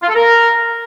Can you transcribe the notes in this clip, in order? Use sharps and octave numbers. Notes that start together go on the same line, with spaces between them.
F4
A4
A#4